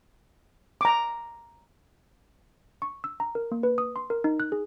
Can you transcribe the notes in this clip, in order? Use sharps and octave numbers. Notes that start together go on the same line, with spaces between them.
A#5 D6
C#6
E6
A#5
A#4
A#3
B4
D#6
C6
A#4
D#4
F#6
G#4